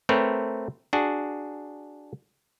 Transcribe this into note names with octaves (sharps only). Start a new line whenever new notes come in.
A3 C4 A#4 B4 C#5
D4 F#4 G#4